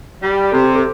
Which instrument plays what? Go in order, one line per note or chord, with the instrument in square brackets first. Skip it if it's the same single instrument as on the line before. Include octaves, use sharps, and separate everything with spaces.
[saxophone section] G3
[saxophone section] C3 [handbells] A4
[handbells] G4
A4